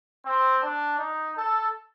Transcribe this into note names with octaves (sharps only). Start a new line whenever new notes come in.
C4
D4
D#4
A4